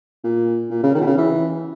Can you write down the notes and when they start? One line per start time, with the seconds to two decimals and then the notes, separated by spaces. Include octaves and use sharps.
0.24 A#2
0.70 A#2
0.83 C#3
0.95 D#3
1.01 B2
1.07 C#3
1.18 E3